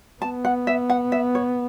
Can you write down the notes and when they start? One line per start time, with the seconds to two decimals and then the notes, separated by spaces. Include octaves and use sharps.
0.22 B3 A5
0.45 F#5
0.67 E5
0.89 F#5
1.12 E5
1.35 C#5